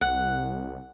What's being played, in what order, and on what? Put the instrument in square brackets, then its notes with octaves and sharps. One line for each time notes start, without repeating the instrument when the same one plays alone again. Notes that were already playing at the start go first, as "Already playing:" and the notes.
[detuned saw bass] C2 [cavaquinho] F#5